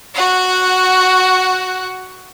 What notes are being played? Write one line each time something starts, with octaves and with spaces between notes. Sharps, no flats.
F#4 F#5